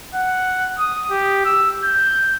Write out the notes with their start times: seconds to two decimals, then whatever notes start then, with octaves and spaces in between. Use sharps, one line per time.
0.14 F#5
0.78 D#6
1.11 G4
1.45 E6
1.84 G6